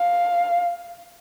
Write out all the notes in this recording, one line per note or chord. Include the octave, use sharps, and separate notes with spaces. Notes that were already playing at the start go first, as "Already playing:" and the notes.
Already playing: F5